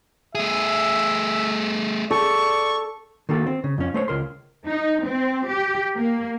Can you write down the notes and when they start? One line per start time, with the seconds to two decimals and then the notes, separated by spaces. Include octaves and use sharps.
0.35 A3 G#4 E5
2.11 A4 D5 C#6
3.29 D#3 A#3 F#4 A4
3.47 C4
3.64 C#3
3.78 F2 C#4
3.94 A3 C5 C#5
4.08 C#2 A#4 C6
4.67 D#4
5.05 C4
5.48 G4
5.96 A#3